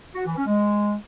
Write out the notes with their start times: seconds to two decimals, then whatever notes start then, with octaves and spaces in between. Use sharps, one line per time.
0.15 F#4
0.25 E3
0.36 C#4
0.46 G#3